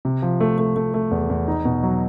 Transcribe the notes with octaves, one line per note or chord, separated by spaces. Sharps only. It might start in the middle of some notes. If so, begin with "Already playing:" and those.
C3
F3
A3
A3
A3
A3
E2
E2
D#4
B2
F#3